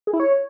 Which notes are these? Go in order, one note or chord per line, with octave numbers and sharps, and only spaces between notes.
G#4
E4
C#5